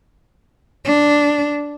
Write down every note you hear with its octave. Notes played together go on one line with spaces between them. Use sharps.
D4